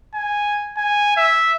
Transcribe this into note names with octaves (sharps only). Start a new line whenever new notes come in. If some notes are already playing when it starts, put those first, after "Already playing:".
G#5
G#5
E5